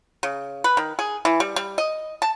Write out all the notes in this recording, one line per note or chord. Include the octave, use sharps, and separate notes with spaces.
C#3
B4
D#3
G#4
E3
G3
G3
D#5
A5